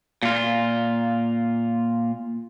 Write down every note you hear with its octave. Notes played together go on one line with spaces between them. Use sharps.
A#2 F4